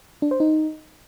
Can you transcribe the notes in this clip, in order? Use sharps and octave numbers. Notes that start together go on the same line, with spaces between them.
D4
C5
D#4